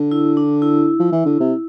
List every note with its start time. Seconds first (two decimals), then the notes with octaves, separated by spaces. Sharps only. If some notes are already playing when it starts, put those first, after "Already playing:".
Already playing: D3
0.11 E4
0.37 D4
0.62 E4
1.00 F3
1.12 E3
1.26 D3
1.40 C3